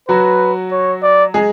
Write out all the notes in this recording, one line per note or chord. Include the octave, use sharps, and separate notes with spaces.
F#3 F#4 B4
C#5
D5
G#3 G#4